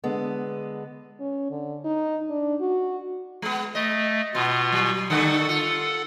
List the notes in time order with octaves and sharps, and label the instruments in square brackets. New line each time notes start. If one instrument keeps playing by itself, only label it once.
[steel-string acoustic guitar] D3 G#3 B3
[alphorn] C#4
D3
D#4
D4
F#4
[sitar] G#3 B3
[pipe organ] A3 [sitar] D#5
[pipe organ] B2 F4 [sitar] B3
[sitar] F#3
[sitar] D3 G3 A3 [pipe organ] A4 F#5
[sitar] F4